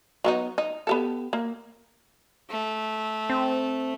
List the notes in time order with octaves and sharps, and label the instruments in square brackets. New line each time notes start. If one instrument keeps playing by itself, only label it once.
[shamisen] F#3 B3 D#4
D#4
B3 G4 A4
A#3
[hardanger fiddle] A3
[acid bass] C4